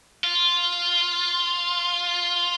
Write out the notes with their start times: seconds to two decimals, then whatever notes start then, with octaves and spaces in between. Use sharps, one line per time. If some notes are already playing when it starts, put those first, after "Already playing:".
0.24 F4